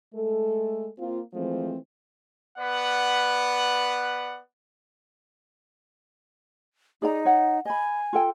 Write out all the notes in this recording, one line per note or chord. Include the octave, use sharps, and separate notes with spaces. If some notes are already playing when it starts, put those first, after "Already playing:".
G#3 A3 A4
A#3 C4 F4
E3 F3 G#3 A3 C4
B3 B4 D5 F#5
D#4 G#4 D5 A#5
C#5 F#5
D#5 G#5 B5
F4 A4 G5